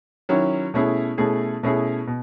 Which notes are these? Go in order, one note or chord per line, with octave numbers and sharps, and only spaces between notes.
D#3 F#3 C#4 E4
B2 A3 C#4 E4 G#4
B2 A3 C#4 E4 G#4
B2 A3 C#4 E4 G#4
B2